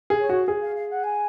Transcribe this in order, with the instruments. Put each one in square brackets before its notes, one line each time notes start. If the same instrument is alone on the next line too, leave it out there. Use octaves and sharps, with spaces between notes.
[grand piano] G#4
[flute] C#5
[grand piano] F#4
G#4
[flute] F5
F5
F#5
G#5